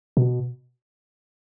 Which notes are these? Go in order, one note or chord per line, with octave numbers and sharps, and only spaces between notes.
B2